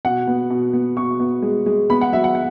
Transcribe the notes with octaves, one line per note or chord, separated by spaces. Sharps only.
B2 F#5
B3
B2
B3
B2 C#6
B3
G#3
G#3
B3 B5
F#5
F#3 E5
F#5
F#5